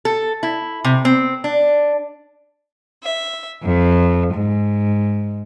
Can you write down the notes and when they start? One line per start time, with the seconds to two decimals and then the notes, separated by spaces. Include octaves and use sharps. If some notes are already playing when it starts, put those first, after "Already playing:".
0.05 A4
0.43 E4
0.84 C3
1.05 C4
1.44 D4
3.02 E5
3.64 F2
4.33 G#2